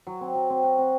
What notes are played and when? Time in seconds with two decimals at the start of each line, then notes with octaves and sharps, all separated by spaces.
0.07 F#3
0.21 C4
0.35 F#3
0.50 C4
0.63 F#4
0.78 C4